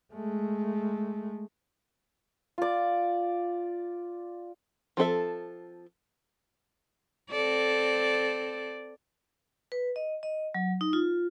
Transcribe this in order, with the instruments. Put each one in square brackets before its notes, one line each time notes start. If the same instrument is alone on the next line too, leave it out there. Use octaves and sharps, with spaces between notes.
[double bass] G#3 A3
[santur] F4 D5
[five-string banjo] F3 C4 A4 E5
[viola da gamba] C4 A4 D5
[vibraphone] B4
D#5
D#5
F#3
D#4
F4